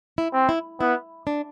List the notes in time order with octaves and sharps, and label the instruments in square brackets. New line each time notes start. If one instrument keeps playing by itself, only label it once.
[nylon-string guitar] E4
[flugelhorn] C4
[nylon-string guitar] E4
[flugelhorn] B3 [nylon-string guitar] E4
[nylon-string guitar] D4